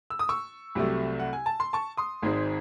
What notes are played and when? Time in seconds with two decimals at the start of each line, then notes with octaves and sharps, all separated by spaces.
0.10 E6
0.19 D#6
0.29 C#6 E6
0.75 C2 C3 F#3 A3
1.19 F#5
1.33 G#5
1.46 A5
1.60 C6
1.73 A5 C#6
1.97 C6 D#6
2.22 G#1 G#2 D#3 G#3 C4